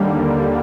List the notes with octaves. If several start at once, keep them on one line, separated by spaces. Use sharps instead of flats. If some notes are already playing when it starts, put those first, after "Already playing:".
Already playing: D#2 D3 G3 A#3